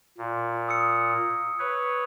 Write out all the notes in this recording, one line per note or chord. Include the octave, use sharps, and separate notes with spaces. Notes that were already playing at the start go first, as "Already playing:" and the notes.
A#2
D#6 E6 C#7
B4 C#5